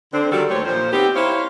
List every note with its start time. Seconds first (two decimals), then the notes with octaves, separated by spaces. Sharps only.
0.13 D3 C4 D4
0.31 D#3 F#3 G3 F#4 A4 A#4
0.50 D#2 A3 G4 C5 C#5
0.65 A#2 F3 C5
0.92 B3 C4 D#4 G4
1.15 D#4 E4 C5 C#5 F5